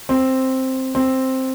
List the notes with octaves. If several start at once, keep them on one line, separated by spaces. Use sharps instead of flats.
C4
C4